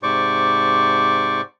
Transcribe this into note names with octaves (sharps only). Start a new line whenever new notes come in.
G#2 C3 C5 D5 C#6 D6